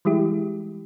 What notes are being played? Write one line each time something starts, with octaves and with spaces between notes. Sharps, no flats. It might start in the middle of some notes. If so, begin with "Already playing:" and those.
E3 G3 G#3 E4 G4